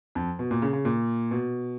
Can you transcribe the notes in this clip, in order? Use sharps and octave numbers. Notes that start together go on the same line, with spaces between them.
F2
B2
A#2
C#3
C#3
A#2
B2